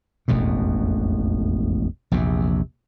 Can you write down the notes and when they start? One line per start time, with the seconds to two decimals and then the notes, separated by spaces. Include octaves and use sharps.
0.28 E1 A1 F2 B2
2.12 A#1 E2 C3